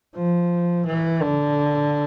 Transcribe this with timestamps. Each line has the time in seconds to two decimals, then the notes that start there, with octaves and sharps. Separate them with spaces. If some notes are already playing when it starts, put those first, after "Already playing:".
0.16 F3
0.86 E3
1.22 D3